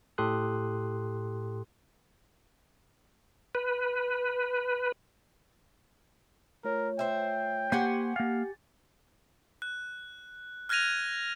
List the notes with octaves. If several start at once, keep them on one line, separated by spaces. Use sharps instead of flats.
A2 G4 A4 C6 D#6 F#6
B4
A3 F4 A#4 C#5
C5 E5 G5
A#3 G4 C5 F#5 G#5 C6 C#6 G#6
A#3 F5 A6
F#6
F6 F#6 G#6 A#6 D#7 F7